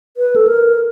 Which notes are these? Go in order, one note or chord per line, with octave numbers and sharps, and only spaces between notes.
B4
A4
A#4